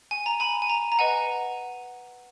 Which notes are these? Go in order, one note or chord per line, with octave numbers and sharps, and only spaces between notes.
G#5
A#5
G#5 B5
G#5
A#5
A#5
B4 D#5 F#5 G#5